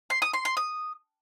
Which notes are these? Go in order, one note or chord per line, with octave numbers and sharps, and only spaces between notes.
C6
D#6
C6
C6
D#6